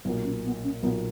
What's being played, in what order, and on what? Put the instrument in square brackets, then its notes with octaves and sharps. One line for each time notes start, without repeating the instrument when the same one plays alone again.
[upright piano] B1 A#2 A#3 [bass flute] B3
[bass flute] C#4
B3
C#4
[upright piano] B1 A#2 A#3 [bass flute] B3